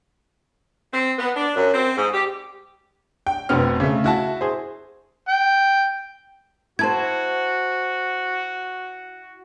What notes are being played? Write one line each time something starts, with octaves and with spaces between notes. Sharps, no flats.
C4
B3
D4
F#2
C4
G#2
G4
G5
F1 B2 B3 C4 F6
C#3 A3
E4 F#4 A5
G#4 C5
G5
E4 F#4 C5 A5 G#6